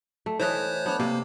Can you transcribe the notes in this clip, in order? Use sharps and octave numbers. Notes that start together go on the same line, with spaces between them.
A3
E3 A3 C5 C#5 D#5 F#6
B3 D4
C3 A#3